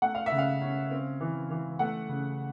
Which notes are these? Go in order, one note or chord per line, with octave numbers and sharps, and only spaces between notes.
A3 F#5
F5
E5
C#3
F5
C#4
C4
E3
E3
A3 F#5
C#3